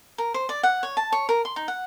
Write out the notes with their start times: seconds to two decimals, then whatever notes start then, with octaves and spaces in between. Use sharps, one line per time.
0.18 A#4
0.34 C5
0.49 D5
0.63 F#5
0.83 C#5
0.97 A5
1.12 C#5
1.29 A#4
1.45 C6
1.56 D#4
1.68 F#5